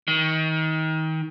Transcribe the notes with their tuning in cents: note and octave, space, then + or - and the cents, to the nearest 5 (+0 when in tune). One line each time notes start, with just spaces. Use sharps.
D#3 +30